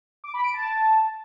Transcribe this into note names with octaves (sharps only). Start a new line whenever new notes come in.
D6
B5
D7
A5